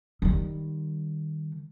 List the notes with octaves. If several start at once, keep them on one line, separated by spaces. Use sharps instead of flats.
D#3 G3